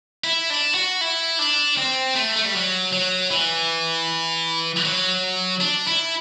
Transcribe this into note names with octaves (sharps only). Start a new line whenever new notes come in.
E4
D4
F#4
E4
D4
C4
A3
A3
G3
F#3
F#3
E3
F#3
D4
E4